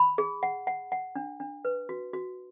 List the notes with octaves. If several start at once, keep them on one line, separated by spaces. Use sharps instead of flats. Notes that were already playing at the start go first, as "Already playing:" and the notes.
Already playing: B5
G#4
F#5
F#5
F#5
D4
D4
B4
F#4
F#4